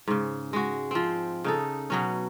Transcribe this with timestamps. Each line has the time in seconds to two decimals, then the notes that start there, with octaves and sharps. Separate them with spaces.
0.08 G#2 C#3
0.53 G#3 F#4
0.91 F3 C4
1.44 C#3 D#4 A4
1.90 B2 F#3 C#4